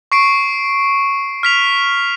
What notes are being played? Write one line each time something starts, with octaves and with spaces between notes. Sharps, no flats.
C#6 C7 D7
F6 B6 F7